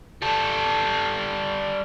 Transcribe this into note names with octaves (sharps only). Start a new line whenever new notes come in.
G3 A4